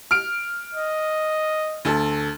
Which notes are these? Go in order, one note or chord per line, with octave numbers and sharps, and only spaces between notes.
F6 D7
D#5
D2 A4